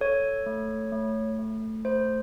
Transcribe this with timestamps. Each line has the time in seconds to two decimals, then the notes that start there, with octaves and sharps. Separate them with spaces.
0.01 A4 C#5
0.46 A3
0.92 A3
1.39 A3
1.85 A3 C5